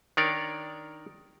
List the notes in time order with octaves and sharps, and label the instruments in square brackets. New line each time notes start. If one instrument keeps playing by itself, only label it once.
[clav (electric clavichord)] D#3 D4 A#4 C#5 D5